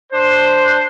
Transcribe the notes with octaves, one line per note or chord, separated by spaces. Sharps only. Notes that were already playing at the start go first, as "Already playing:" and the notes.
D4 C5